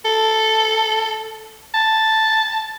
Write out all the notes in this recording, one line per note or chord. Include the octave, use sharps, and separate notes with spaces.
A4
A5